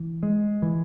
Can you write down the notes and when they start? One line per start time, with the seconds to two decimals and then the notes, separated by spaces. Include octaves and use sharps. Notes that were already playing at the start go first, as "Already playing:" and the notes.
Already playing: E3
0.23 G#3
0.62 E3